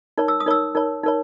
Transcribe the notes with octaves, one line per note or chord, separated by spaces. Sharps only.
D#4 A#4 C#5
E6
D#6
D#4 A#4 C#5 E6
D#4 A#4 C#5
D#4 A#4 C#5